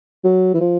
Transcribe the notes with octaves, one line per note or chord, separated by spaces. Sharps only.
F#3
E3
F3